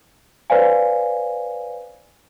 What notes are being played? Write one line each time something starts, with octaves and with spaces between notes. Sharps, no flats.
B4 C5 D5 F5 G#5